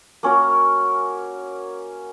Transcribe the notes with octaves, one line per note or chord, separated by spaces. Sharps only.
A#3 C#4 F#4 A#4